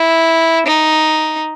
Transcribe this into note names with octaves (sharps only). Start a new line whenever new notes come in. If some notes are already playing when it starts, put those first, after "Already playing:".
Already playing: E4
D#4